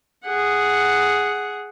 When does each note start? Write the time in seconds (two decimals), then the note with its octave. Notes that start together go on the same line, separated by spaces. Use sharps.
0.25 G#4 F#5